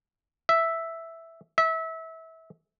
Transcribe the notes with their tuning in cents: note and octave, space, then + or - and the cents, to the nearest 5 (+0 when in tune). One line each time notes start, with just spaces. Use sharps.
E5 +0
E5 -25